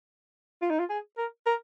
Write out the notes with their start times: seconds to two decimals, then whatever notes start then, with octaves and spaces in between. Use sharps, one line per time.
0.62 F4
0.70 D#4
0.79 F4
0.89 G#4
1.17 A#4
1.46 A#4